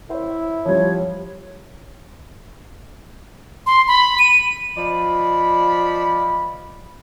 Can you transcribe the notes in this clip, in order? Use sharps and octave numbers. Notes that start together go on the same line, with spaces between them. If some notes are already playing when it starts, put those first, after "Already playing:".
E4 C5 C#5
F3 G3 C#5
C6
B5
D#7
F3 D5 D#5 B5